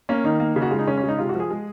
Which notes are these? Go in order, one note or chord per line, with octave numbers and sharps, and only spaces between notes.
A#3 C#4
D#3 D#4
A#3
C#3
F#4
G#3 F4
D#4
C#3 C#4
C#4
G#3
D#4
C3 F4
F#4
F3 G#4
G#3